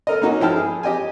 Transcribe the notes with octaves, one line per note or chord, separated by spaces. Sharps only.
A4 A#4 D#5
A#3 C#4 D#4 F#4 A#4
F3 E4 G5 A5 F6
G#4
G4 D#5 G5 G#5